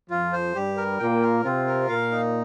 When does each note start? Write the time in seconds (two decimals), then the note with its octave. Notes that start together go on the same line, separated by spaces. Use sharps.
0.10 F2 F3 F4
0.33 C5
0.55 G2 G3 G4
0.77 A#4
0.99 A#2 A#3 G5
1.22 A#4
1.44 C3 C4 F4
1.67 A#4
1.88 A#2 A#3 F5
2.11 D#4